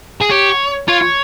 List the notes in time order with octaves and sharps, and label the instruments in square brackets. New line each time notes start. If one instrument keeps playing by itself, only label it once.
[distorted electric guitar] G#4
[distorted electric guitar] G4 [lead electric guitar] C#5
[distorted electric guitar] F4 [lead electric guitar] C#5